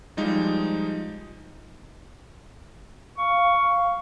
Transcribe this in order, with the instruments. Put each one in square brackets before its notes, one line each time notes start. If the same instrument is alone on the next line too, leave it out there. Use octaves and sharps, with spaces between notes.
[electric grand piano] F3 G3 G#3 D#4
[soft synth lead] F5 [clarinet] C#6